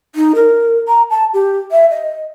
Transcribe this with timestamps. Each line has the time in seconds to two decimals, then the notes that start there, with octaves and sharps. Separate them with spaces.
0.15 D#4
0.35 A#4
0.88 A#5
1.10 A5
1.34 G4
1.71 E5
1.90 D#5